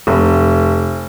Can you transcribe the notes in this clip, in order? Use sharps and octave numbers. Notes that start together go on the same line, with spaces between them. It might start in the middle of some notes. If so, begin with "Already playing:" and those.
F1